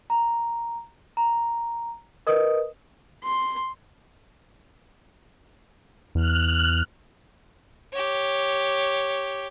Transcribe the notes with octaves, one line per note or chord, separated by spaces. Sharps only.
A#5
A#5
A#4 B4 D#5 D#6
C6
E2 F6 F#6
G4 C#5